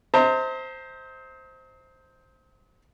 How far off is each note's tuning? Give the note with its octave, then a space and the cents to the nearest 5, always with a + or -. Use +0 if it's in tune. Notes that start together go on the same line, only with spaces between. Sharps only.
C5 +0 D#5 +45 A#5 -40